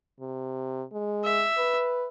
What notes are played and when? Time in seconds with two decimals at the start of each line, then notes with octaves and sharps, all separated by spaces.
0.20 C3
0.92 G#3
1.24 E5
1.58 B4